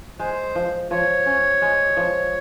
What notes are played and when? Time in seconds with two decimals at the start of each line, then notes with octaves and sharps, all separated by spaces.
0.19 G#3 C5
0.55 F3
0.91 F3 C#5
1.26 C#4
1.62 G#3
1.97 F3